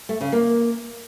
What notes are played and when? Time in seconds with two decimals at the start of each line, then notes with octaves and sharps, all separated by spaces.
0.09 A3
0.21 C#3
0.32 A#3